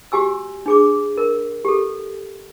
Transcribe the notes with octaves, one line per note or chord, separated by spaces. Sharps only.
F#4 G4 G#5 E6
D4 G#4 D6
A#4
G4 A4